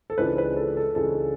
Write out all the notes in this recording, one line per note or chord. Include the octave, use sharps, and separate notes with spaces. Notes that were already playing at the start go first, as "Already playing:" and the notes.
A4
C#2 C#3 E3 G#3 D4 B4
B4
A4
A4
C#2 C#3 E3 G#3 D4 A4